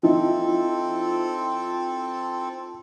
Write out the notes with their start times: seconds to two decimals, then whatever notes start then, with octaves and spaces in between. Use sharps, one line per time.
0.03 F3 C4 D#4 E4 A4